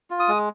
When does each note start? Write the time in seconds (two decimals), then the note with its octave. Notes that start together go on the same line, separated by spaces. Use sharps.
0.10 F4
0.20 D#6
0.28 G#3